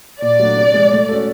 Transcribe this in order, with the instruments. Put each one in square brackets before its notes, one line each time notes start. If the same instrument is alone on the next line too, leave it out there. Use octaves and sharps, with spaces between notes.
[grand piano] A#2 [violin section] D5
[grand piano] F#3 A3 D4
C3
F3 G#3
A3
C#4 F#4 A4